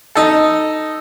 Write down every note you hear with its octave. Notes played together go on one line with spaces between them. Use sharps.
D#4 A4